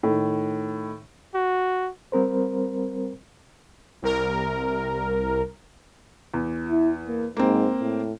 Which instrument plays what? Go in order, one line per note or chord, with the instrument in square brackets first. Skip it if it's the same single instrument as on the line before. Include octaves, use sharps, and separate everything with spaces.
[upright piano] A2 D#3
[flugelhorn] F#4
[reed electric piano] G3 C4 A#4 C5
[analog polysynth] C2 A#4
[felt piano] E2
[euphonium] E4
A#3
[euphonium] G#2 [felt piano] A#3 C4
[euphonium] A2